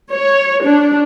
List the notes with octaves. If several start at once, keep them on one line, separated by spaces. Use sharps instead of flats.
C#5
D4